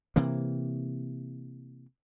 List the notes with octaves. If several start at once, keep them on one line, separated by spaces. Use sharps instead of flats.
C3 E3 A#3